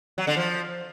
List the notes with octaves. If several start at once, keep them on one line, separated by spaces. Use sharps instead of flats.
F#3
D3
F3